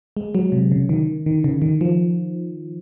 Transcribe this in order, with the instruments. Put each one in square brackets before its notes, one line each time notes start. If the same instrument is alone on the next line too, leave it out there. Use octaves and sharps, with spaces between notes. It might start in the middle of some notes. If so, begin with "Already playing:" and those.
[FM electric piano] G#3
F#3
C3
C#3
D#3
D#3
C#3
D#3
F3